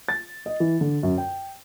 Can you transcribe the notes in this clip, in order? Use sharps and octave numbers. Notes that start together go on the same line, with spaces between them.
A6
D#5
E3
D3
F#2
G5